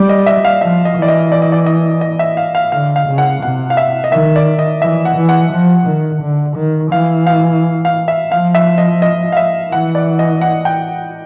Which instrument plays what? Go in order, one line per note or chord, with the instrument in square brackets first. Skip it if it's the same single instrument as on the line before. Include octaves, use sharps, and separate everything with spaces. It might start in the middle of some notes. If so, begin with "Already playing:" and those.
Already playing: [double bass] G3 [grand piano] D5
[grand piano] D#5
E5
F5
[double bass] F3 [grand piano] E5
[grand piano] D#5
[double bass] E3
[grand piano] D5
D#5
D5
D#5
D5
D#5
D#5
E5
F5
F5
[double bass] D3 [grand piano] F5
[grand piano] F5
[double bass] C#3
[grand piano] F#5
[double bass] C3 [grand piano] F#5
[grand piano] F5
E5
D#5
[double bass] D#3 [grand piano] E5
[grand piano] D5
D#5
[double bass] E3 [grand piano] E5
[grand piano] F#5
[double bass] E3
[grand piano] F#5
[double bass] F3
D#3
D3
D#3
[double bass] E3 [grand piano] F5
[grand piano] F5
F5
E5
[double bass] F3 [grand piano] F5
[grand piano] E5
D#5
D#5
F5
E5
[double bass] E3 [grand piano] F#5
[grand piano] D5
D#5
F#5
G5